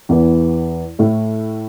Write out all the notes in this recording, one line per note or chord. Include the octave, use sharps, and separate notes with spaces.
E2 E3 B3
A2 A3 E4